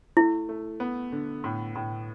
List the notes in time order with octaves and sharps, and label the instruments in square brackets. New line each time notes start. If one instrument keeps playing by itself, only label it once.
[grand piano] A3 [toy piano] E4
[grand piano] A3
B3
D3
A2
A2